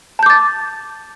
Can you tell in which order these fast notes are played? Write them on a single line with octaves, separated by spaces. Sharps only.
A5 G6 D6 A6